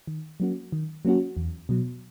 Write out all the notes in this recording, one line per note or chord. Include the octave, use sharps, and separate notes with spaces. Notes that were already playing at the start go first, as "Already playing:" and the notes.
D#3
F#3 A#3 C#4 F#4
D#3
F#3 A#3 C#4 F#4
E2
B2 F#3